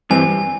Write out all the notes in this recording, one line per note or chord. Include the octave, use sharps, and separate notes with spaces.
G2 E3 G3 C4 G#5